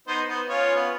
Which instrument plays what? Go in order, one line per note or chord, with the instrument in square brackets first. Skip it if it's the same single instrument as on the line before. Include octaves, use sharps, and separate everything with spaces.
[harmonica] B3 D#4 C5
B3
C#4 F4 C#5
B3